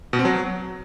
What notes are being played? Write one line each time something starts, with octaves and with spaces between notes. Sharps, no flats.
B2
C4
F#3